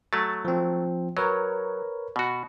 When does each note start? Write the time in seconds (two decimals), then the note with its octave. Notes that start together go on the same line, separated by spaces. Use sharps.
0.13 F#3 A3 A6
0.45 F3 C4
1.17 F#3 A#4 B4 C#5
2.16 B2 F#4